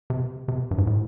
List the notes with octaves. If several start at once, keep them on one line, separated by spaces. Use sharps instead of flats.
C3
C3
G2
G#2
A2